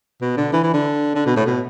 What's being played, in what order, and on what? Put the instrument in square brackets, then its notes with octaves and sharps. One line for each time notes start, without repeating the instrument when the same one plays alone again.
[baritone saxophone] B2
D3
E3
E3
D3
D3
B2
A2
B2